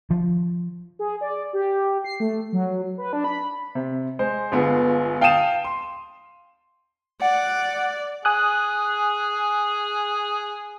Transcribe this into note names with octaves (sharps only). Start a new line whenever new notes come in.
F3
G#4
D5
G4
C7
A3
F#3
B4
D4
B5
C3
G#3 C5
G1 D3 G#3 B3 F4 G#4
F5 G5 A5 D#6 D#7 E7
C6
D5 F#5
G#4 G#5 D#6 F#6